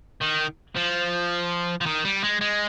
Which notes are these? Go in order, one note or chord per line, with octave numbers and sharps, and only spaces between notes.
D#3
F3
F3
D#3
G3
G#3
G#3